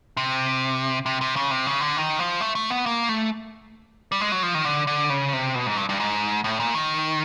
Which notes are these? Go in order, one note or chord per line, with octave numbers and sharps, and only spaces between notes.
C3
C3
C3
C#3
C3
C#3
D3
D#3
F3
A3
A3
B3
A#3
A3
G3
G#3
F#3
F3
D#3
D3
D3
C#3
C3
B2
G#2
G2
G2
G#2
A2
A#2
D#3